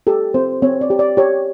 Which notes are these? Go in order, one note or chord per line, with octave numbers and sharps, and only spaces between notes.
G4 A4
C4 C5
C4 C#5
D5
G4
D5
G4 C#5